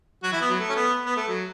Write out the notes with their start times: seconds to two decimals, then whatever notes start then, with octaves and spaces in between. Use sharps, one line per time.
0.23 F#3 F#4
0.32 E3 E4
0.41 B3
0.50 F#3
0.59 A3
0.70 C#4
0.76 B3
1.06 B3
1.17 A3
1.28 F#3